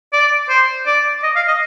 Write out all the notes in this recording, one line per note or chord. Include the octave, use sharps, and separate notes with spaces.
D5
C5
D5
D#5
F5
D#5